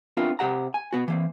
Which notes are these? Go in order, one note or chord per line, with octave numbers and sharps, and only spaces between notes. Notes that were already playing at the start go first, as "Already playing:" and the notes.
B3 C4 D4 E4 F4 A#4
C3 G4 F#5 A#5
G#5
B2 B3 F#4
E3 A#3 C4